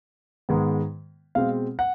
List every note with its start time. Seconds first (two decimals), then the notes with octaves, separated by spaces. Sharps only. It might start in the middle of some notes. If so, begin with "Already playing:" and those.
0.49 G#2 D#3 G#3 B3
1.35 B2 G#3 C4 F5
1.79 F#5